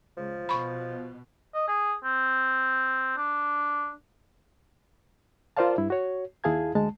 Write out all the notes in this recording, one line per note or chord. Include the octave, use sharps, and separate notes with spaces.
C#2 F3
B2 B5 C#6
D#5
G#4
C4
D4
F4 A#4 C5 D5 F5 A5
G2 E4
F#4 C#5
D#2 E4 G#4 F5 A5 G#6
D2 G#3 A5